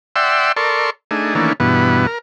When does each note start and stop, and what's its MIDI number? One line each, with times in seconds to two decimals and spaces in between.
0.16 0.52 74
0.16 0.52 76
0.16 0.52 78
0.16 0.52 79
0.16 0.52 84
0.16 0.52 88
0.57 0.90 69
0.57 0.90 70
0.57 0.90 74
0.57 0.90 84
0.57 0.90 85
1.11 1.34 57
1.11 1.34 62
1.11 1.34 63
1.11 1.34 68
1.35 1.53 51
1.35 1.53 52
1.35 1.53 57
1.35 1.53 58
1.35 1.53 61
1.35 1.53 62
1.60 2.06 43
1.60 2.06 47
1.60 2.06 52
1.60 2.06 59
2.07 2.18 70